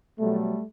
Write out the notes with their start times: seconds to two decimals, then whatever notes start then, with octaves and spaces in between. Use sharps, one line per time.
0.20 B2 F#3 G3 A3